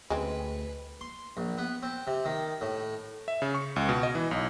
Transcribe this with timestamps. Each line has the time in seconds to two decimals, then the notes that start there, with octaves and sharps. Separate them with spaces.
0.10 D2 G#3 C4 C#4 B4
1.01 C6
1.37 A#1
1.58 B3
1.83 C4
2.07 C3
2.25 D#3
2.61 A2
3.28 E5
3.42 C#3
3.54 C#6
3.76 C#2
3.89 B2
4.03 D#5
4.15 E3
4.31 B1